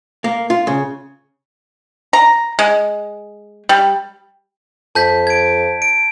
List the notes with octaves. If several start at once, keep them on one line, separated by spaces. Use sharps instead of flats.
A#3
F4
C#3
A#5
G#3
G3
F2 A5 G6 B6
G#6 D7
D7